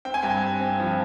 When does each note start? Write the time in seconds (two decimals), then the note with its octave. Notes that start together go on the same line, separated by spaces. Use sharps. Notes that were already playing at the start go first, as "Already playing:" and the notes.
0.05 C4 G5
0.14 G#5
0.23 G2 G5
0.43 C4
0.60 C4
0.80 F3